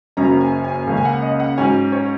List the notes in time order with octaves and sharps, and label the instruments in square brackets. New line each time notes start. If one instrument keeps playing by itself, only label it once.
[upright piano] F#1 F#2 F#3 A#3 C#4 A#5
G#5
G#5
C#2 C#3 A#3 C#4
G#5
F#5
D#5
F#5
G#2 F#3 C#4 G#5
C#5